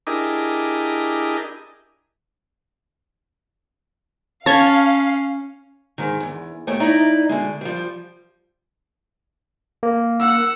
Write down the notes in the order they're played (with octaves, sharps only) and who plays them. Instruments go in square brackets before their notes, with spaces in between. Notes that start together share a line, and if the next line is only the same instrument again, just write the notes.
[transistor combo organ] D4 E4 G4 G#4 A#4 D#5
[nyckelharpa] C#4 [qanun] C#5 [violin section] F5 [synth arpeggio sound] A5 G#6
[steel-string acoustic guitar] G#2 D#3
E2
D#2 B2 A3 C#5 G5
D#4 E4 D5 D#5
B2 D3 G#3
F3 G3
[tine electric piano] A#3
[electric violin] F#5 E6